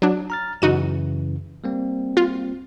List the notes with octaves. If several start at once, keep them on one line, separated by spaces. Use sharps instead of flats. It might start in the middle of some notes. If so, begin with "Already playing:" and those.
F#3 D4
A#5 F6 A6
F#2 C#3 E3 D#4 F#4 D#7
G3 A#3 C4
F4